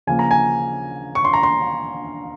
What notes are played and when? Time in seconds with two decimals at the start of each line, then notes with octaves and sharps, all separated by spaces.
0.07 C#3 F3 A#3 G#5
0.19 A#5
0.31 G#5
1.15 C#6
1.25 C6
1.33 A#5
1.43 C6